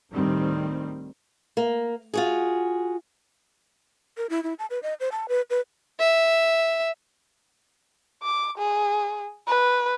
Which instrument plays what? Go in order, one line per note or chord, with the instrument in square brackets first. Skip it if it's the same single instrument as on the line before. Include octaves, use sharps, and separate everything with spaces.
[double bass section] D2 A2 D#3 G3 C4
[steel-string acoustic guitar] A#3
F4 F#4 G#4
[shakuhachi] A#4
E4
E4
A5
B4
D#5
C5
A5
B4
B4
[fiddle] E5
[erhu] D6
G#4
B4